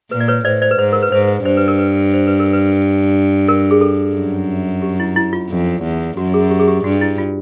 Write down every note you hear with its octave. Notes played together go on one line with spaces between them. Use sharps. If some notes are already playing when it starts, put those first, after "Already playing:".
A#2 B4
D5
B4 C#5
A2 C5 D5
C5 D5
B4
G#2 C5
A#4
B4
G#2 C5
G2 C5
B4
A#4
B4
C5
B4
A#4
B4
A#4
G#4
A4
F#2
G4
E4
E4
F4
F2
E2
F#2 F#4
G#4
G4
G#4
G4
G2 F#4
E4
F4